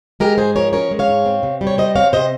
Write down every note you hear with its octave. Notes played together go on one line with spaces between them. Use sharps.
G#3 G4 A#4
G#2 G#4 C5
F3 A#4 C#5
C#4 A#4 C#5
G#3
C#5 F5
G#2
C4
C3
G3
C#5
C3 C5 D#5
C4 C#5 F5
C3 C5 D#5